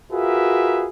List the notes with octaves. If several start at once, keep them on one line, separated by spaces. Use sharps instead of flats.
F4 F#4 G#4 A#4 B4 E5